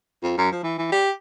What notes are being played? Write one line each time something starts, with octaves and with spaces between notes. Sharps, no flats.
F2
F#2
F3
E3
E3
G4